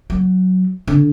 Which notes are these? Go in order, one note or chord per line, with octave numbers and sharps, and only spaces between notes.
F#3
D3